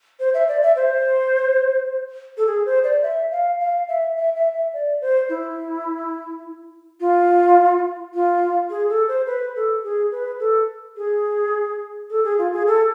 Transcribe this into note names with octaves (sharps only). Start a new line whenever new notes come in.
C5
E5
D5
E5
C5
A4
G#4
C5
D5
E5
F5
F5
E5
E5
E5
E5
D5
C5
E4
F4
F4
G#4
A4
C5
B4
A4
G#4
B4
A4
G#4
A4
G#4
F4
G#4
A4